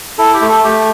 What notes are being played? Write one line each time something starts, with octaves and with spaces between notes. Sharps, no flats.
E4 A4
G4
A3
A4
A3 G4